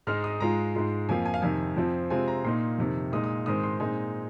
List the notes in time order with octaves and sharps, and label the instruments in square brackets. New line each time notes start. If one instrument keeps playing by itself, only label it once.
[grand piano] G#2 G#3 D#4 F6
D#6
G#2 G#3 F4 A#5
G#2 G#3 F4
F2 F3 A#3 F4 G#5
G#5
F5
F2 C3 D#3 G#5
F2 F3 C4 F4
C3 G#3 C4 F4 G#5
A#5
A#2 A#3 D#4 C6
F2 C3 D#3
A#2 G#3 D#4 D#6
D#6
G#2 D#3 G#3 C4 D#6
C6
A#2 G#3 C4 D#4 G#5